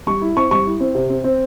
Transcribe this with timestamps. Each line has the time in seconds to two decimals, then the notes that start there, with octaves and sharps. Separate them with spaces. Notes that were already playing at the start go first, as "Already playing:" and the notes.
0.07 G3 C#6
0.21 E4
0.36 C4 C#6
0.51 G3 C#6
0.66 E4
0.80 C4
0.95 C3
1.10 C4
1.24 C4